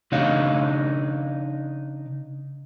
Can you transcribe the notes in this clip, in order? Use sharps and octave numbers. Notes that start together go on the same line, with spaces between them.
C#3 D4 D#4 C#5 F5